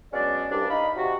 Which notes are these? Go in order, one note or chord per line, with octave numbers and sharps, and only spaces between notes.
F#3 G#3 B3 C#4 D4 D5
C2 G2 D4
D4 D#4 D#5 F5 B5
C3 F#4